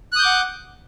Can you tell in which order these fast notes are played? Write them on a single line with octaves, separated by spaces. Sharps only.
F#6 D#6 G6 D6 F#5